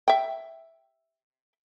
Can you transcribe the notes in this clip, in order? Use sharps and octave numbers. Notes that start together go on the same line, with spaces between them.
E5 G5